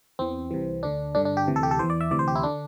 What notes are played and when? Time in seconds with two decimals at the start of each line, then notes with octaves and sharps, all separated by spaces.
0.19 E2 E3 C4
0.51 C2 C3 E3
0.83 D2 D3 D4
1.15 G2 D3 D4
1.25 D4
1.37 G4
1.47 D2 C3 E3
1.56 A4
1.63 G4
1.71 A4
1.79 E2 E3 C5
1.90 D5
2.01 E5
2.11 D2 C3 E3 D5
2.19 C5
2.28 G4
2.35 E4
2.43 D3 D4